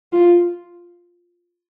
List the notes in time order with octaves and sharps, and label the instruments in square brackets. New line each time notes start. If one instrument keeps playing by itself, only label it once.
[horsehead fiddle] F4